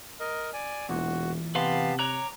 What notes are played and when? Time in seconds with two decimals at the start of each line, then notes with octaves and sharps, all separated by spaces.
0.20 A#4 D#5
0.54 D5 G#5
0.89 E1 E2 A#2 F#4
1.55 C3 B3 G4 B4 F5 A5 C6
1.99 C#5 A#5 D6 F#6